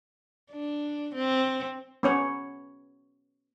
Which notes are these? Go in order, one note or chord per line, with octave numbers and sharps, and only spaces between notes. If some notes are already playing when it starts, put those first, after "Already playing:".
D4
C4
B3 C#4 C#5